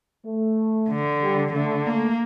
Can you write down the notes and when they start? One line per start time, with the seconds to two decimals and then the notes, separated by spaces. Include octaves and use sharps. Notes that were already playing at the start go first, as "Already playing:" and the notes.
0.25 A3
0.89 D3
1.21 G3
1.54 D3 A3
1.86 A3 A#3